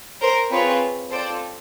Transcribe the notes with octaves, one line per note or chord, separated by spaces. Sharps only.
A#4 C5
C4 F4 G#4 B4 C#5
C4 F4 A4 C5 D5